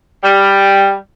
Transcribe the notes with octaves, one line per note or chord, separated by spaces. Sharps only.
G3